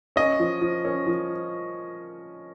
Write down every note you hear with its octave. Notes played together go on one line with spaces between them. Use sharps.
C#4 D#5
F3
F3
C#4
F3